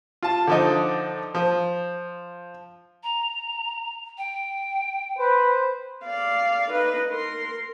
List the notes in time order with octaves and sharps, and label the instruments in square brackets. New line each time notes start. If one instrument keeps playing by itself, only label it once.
[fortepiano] F4 A5
D3 F3 D#4
F3
[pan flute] A#5
G5
[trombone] B4 [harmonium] C5
[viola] D5 F5
D#4 B4
A#4 C6